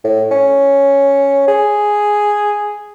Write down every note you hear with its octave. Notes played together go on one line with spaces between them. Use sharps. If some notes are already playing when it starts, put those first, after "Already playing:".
A2
C#4
G#4